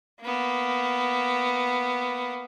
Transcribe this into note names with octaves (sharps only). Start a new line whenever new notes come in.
A#3 B3